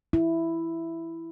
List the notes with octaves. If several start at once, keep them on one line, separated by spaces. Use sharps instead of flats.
E4